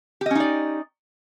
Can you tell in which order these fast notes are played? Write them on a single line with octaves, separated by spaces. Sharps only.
G4 D#5 C#4 D#4 D5